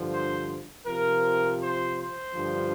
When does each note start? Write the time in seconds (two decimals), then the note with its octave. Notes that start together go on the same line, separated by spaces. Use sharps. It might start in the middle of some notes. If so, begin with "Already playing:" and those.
Already playing: G2 D3 F3
0.11 C5
0.86 C3 F3 A#4
1.61 C5
1.98 C5
2.36 G2 D3 F3